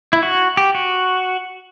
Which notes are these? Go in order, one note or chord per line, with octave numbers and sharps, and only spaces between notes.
E4
F#4
G4
F#4